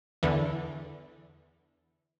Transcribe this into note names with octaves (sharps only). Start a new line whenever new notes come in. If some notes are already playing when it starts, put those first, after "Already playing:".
E2 D3 E3